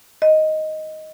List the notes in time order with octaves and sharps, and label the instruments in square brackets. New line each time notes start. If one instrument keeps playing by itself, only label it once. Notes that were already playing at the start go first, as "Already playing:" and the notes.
[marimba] D#5